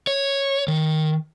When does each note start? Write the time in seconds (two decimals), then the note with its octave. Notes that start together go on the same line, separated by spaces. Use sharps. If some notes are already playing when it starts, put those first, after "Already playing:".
0.07 C#5
0.68 D#3